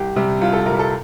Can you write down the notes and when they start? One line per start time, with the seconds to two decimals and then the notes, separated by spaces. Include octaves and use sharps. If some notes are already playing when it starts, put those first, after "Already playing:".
Already playing: C2 G4
0.16 C3 G3
0.41 C2 F4
0.53 A4
0.65 C3 G3 A#4
0.79 A4